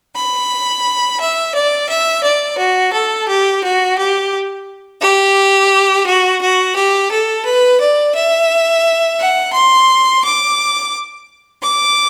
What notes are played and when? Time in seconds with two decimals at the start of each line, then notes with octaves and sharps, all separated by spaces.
0.14 B5
1.19 E5
1.54 D5
1.88 E5
2.23 D5
2.57 F#4
2.92 A4
3.27 G4
3.62 F#4
3.97 G4
5.01 G4
6.06 F#4
6.40 F#4
6.75 G4
7.10 A4
7.45 B4
7.80 D5
8.15 E5
9.18 F#5
9.53 C6
10.23 D6
11.62 D6